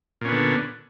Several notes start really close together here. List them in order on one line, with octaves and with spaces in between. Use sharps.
A#2 C#4 B3 D3